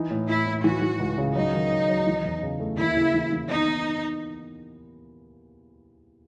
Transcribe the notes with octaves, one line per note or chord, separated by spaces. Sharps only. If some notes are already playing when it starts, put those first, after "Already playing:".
Already playing: E3 D#4
A2
A2 E4
A2
E3 F#4
E3
C#2
C#3
F#3 D#4
D#3
C#4
F#3
E3
E2
C#3
A3
D#2 E4
C#3
E3
E3
B3 D#4
B3